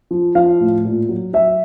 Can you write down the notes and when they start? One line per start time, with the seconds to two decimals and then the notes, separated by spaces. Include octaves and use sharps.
0.11 F3
0.35 F3 F5
0.60 A2
0.85 A#2
1.09 F#3
1.33 F#3 E5